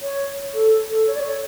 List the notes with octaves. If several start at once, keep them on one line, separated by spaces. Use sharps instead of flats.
C#5
A4
A4
C#5
D5
C#5